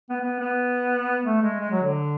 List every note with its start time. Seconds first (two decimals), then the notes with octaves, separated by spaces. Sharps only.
0.10 B3
0.21 B3
0.39 B3
1.25 A3
1.42 G#3
1.60 G#3
1.71 F#3
1.82 D3